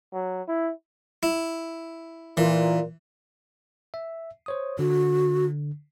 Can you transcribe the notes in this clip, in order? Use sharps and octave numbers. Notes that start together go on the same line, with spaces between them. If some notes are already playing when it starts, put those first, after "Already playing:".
F#3
E4
E4
A#2 E3
E5
C5 C#5 D#6
D3 F#4